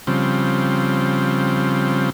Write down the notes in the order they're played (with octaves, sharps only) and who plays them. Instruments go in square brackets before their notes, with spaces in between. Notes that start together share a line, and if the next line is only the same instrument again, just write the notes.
[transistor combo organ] C#3 F3 G3 C4